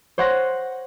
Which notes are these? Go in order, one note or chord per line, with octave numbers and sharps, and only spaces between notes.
C5 C#5 F#5 C6 F#6 A#6